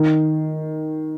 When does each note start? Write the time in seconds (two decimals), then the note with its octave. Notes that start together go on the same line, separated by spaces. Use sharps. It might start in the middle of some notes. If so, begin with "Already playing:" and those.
Already playing: D#3